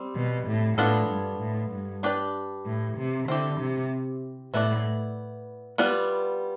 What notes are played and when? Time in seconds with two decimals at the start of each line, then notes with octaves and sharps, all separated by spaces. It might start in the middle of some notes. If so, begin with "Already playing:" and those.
Already playing: G3 C4
0.15 B2
0.47 A2
0.78 A2 B3 D4 F4 A4 D5
1.09 G2
1.40 A2
1.71 G2
2.03 D4 G4 B4 D5
2.66 A2
2.98 C3
3.28 D3 C4 E4 G4
3.60 C3
4.54 A2 B3 E4 B4 D5
5.78 G3 B3 F4 B4 D5